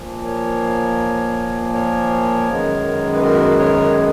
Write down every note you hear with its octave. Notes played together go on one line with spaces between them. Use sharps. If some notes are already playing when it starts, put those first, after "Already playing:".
Already playing: A#2 F3 A#3
A#4 C#5
A#4 C#5
F#2 D#3 G#3 B3
B4
F#4 A#4
A#4 C#5